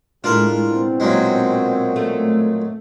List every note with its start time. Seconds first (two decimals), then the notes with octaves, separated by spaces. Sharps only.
0.24 A2 G#3 D4 E4 F4 A#4
0.68 B2 C4
1.00 A#2 F#3 G#3
1.96 A3